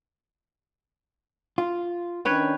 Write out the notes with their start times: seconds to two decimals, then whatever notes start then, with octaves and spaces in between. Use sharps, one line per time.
1.58 F4
2.25 D#3 C#4 D4 B4 C#5 G5